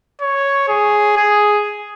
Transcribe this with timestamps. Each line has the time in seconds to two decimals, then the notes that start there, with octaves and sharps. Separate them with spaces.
0.21 C#5
0.69 G#4
1.17 G#4